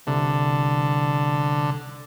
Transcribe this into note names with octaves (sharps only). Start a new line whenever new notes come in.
C2 D3